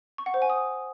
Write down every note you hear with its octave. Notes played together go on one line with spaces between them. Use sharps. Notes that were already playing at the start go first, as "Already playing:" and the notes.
C#6
F#5
C5
G#5
D#6